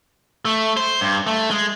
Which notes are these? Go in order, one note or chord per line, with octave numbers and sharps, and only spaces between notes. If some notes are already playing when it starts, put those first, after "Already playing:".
A3
C5
G2
A3
G#3